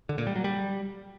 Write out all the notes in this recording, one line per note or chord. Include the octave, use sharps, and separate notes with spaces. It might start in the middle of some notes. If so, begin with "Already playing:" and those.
D3
A#2
G3
F#3
G3